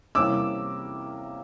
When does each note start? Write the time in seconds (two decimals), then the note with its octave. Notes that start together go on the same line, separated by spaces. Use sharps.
0.15 C3 E3 G3 A#3 C#4 D6 E6